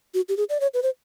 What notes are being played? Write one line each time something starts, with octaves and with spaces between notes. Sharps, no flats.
F#4
G4
G#4
D5
C#5
B4
C5